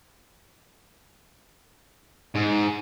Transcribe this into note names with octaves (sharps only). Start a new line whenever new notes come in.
G#2